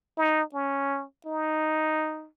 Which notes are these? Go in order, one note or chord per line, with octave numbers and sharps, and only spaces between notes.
D#4
C#4
D#4